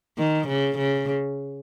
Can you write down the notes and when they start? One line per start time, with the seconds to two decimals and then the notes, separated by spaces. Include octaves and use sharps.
0.18 D#3
0.48 C#3
0.78 C#3